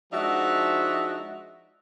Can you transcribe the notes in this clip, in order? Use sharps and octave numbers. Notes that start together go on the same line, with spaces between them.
F3 G#3 D4 D#4 F#4 E5